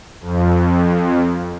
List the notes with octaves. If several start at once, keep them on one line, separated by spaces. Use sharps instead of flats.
F2